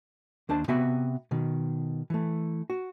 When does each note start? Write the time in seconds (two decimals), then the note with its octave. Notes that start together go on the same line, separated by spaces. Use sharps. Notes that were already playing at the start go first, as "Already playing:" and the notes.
0.49 D#2 D4 C5 A5
0.68 C3 B3 F#4 E5 B5
1.31 B2 D#3
2.10 E3 A3
2.70 F#4